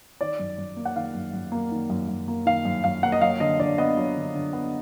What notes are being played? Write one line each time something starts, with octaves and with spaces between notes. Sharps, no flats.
D#3 D5
F#2
F#2
A#3
F#5
D#3 F5
F#2
F#2
A#3
D#3
F#2
F#2
A#3
D#3 F5
F#2
F#2 F5
A#3 F#5
D#5
F#3 F5
D3 D#5
D3 D5
B3 D#5
F#3
D3
D3
B3